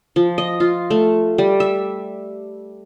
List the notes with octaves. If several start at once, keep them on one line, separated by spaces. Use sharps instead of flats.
F3
D#5
F4
A3
G3
E5